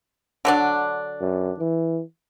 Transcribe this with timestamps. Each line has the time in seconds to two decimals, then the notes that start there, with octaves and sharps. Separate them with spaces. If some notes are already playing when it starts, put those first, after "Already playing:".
0.45 D3 F#3 D4
1.21 F#2
1.59 E3